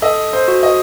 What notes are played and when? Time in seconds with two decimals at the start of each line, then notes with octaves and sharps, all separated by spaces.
0.02 A4 D#5
0.33 C5
0.48 F#4
0.63 D#5